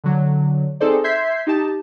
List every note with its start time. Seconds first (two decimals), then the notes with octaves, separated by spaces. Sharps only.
0.04 D3 F#3
0.80 C4 D#4 G#4 A4 C5 D5
1.04 E5 C6 G6 G#6 B6 C7
1.47 D#4 G4 A5